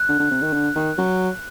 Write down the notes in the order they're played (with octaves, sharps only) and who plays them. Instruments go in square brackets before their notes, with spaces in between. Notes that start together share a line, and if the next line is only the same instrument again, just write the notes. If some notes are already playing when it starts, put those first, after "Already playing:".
Already playing: [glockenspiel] F#6
[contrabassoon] D3
D3
C3
D#3
D3
D#3
F#3